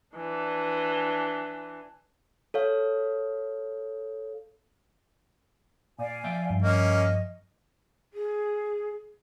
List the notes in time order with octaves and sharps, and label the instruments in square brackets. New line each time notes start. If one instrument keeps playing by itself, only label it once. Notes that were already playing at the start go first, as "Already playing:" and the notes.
[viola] E3 D4
[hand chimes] A4 C#5 F5
[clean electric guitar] A#2 [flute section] D5 F5 G#5
[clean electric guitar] F3 E5 G5
[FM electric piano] G2
[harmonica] A#3 C#4 [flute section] D#5
[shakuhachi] G#4